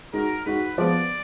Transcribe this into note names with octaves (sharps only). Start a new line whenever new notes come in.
G#3 D#4 F#4 A#4
G#3 D#4 F#4 B4
F3 G#3 B3 D5